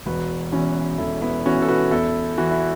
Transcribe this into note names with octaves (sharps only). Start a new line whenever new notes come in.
E1 F#4 B4
E2 E3 C#4 F#4
E1 E4 A4
B3 E4
E2 E3 C#4 F#4
A4
F#4 B4
E2 E4 A4
E3 F#4
E4